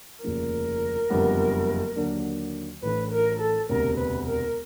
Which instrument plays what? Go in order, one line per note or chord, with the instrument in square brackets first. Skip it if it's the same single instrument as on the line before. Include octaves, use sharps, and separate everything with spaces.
[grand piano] F1 D#2 C#3 F3 A#3 [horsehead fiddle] A#4
[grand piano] F#1 F2 D3 G3 B3
D#2 D3 F#3 A#3 D4
[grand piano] A1 A2 E3 A3 D4 [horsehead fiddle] B4
[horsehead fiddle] A#4
A4
[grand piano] E1 D2 C3 [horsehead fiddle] A#4
[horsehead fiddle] B4
A#4